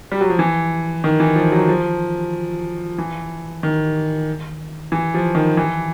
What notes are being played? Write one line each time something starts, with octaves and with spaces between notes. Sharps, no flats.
G3
F#3
F3
E3
D#3
E3
F3
F#3
F3
E3
D#3
E3
F3
D#3
E3